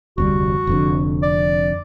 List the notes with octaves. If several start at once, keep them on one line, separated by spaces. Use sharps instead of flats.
F1 D2 G3 F#4
F1 F2 D3
D5